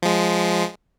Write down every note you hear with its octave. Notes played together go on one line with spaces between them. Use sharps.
F3 G#3